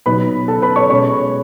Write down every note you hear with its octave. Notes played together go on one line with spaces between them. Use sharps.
B2 F#3 B3 D#4 B4 B5
A4 A5
B4 B5
C#5 C#6
B2 G#3 C#4 C#5 C#6